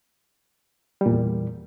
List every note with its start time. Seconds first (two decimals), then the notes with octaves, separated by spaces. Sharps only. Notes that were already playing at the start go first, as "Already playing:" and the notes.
1.01 G3
1.06 A#2
1.11 E2